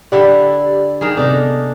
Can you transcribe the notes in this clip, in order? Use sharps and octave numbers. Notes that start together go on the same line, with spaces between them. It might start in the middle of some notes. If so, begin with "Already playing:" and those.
D3 E4 G4 D5 F#5
D#3 A#3 G#4
C3 B3 D4 D#4 A4